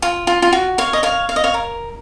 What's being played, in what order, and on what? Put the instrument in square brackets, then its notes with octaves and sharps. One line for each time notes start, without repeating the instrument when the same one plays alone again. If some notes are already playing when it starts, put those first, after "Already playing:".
[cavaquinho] F4
F4
F4
F#4
C#5 F5
D#5
C#5 F5
F5
D#5
C#5 F5
A#4